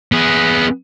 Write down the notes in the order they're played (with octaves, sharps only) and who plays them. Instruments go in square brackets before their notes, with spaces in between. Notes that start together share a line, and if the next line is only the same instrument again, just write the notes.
[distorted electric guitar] B3 G#4